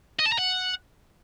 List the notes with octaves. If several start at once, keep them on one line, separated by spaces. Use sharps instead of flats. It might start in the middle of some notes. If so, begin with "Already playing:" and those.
D#5
A5
A#5
F#5